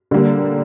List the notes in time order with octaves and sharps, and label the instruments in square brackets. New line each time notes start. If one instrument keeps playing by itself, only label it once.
[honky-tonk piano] D3 G3 A#3